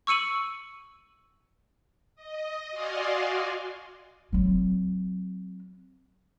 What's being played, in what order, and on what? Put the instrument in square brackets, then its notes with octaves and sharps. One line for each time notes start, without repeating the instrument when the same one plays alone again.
[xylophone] C#6 E6 C#7 D#7 F#7
[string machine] D#5
F#4 D5 D#5 F5 G#5 C6
[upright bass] F#3 C4